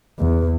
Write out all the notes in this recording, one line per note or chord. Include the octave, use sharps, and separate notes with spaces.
E2